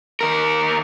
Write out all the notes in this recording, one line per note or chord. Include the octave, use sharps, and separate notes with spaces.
D#2 A#4